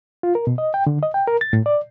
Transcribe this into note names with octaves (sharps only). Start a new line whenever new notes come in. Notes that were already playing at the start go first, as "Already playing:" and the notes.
F4
A#4
B2
D#5
G5
D3
D#5
G5
A#4
A6
A2
D5